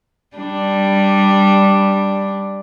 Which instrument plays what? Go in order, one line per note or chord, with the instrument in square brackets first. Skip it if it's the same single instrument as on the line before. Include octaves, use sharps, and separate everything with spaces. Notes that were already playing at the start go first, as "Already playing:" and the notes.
[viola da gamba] G3 D4